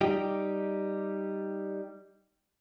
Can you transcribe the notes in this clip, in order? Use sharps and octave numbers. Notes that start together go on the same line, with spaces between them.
G3 D#4 G4